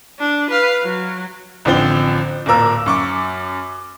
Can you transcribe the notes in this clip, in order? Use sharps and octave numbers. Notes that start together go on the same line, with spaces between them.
D4
B4 F5
F#3
A1 D3 F3 C4 G7
D1 A#2 A#3 A#4 E6
F#2 C#6 D6